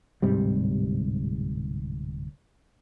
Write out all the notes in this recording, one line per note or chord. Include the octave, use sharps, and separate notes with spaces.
D1 G#2 C3 G3